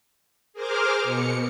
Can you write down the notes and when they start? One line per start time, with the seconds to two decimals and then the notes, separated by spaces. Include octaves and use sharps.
0.53 G#4 A#4 C5 D6 F6
1.03 B2 C#7